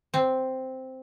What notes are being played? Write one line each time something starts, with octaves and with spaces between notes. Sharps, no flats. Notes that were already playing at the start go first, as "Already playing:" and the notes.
C4